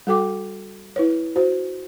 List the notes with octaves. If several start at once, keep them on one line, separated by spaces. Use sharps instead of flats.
G3 F#4 A4 G5 D6
E4 B4 C#5
F#4 C5